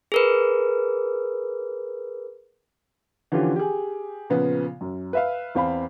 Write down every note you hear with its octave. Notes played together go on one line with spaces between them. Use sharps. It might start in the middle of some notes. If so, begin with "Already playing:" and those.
G#4 A#4 B4
D3 E3 F3 C#4 F4 G4
G4 G#4
A#2 C#3 F3 B3
F#2
B4 E5 F5
E2 C4 F5 B5